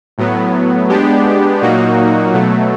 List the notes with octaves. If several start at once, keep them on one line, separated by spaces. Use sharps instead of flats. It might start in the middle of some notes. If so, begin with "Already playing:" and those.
A2 F#3 B3
G#3 B3 D4 G4
A#2 F#3 A#3 D#4 F#4
B2 F#3 A3